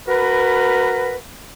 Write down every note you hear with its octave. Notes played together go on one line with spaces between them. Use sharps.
F#4 A#4 B4